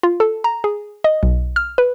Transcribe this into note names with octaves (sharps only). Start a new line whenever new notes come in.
F4
A4
A#5
G#4
D#5
B1
F6
B4